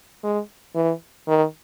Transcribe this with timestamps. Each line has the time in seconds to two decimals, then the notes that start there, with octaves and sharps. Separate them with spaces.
0.23 G#3
0.75 E3
1.28 D#3